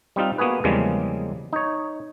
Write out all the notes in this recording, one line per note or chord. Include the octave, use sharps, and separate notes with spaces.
G3 C4 D#4 F4
A#3 B3 F#4 G#4 B4
E2 C#3 F3 G3 G#3 A#3
D#4 C#5